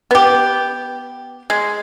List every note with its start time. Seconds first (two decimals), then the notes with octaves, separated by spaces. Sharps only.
0.11 B3 G4
1.50 G#3